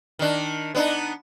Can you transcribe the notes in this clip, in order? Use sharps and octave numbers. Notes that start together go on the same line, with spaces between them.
D#3 D4
B3 D4 D#4